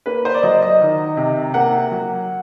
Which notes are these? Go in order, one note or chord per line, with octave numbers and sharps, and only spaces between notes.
A#3 B4
C5
D5
F#3 D#5
D#5
D#3
C3
A#3 F#5
F#3